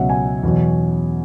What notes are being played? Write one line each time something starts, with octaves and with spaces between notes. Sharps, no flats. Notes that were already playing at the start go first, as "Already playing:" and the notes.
Already playing: C#2 B2 F#3 E5 F#5
G#5
E2 B2 F#3